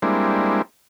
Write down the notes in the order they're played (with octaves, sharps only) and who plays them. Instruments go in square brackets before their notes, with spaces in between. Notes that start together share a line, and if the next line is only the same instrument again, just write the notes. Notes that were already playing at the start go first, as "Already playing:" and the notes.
[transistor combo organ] G3 G#3 A#3 C4 D4 E4